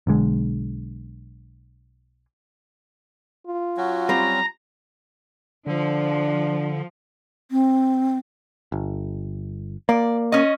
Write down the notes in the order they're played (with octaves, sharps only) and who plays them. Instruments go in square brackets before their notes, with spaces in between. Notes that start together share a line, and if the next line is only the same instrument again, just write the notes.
[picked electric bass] B1 D3 G#3
[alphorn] F4
[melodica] F#3 C#4 F#4
[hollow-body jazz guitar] G3 C4 [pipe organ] A#5
[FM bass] D3 [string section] F3 [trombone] D4
[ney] C4
[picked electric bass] G1
[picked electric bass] A#3 [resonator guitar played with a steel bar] D5
[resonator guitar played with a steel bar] C#4 D#5